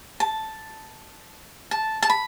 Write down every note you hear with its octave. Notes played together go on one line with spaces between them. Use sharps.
A5
A5
A5
B5